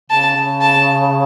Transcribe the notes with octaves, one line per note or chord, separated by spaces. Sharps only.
C#3 A5
C#3
A5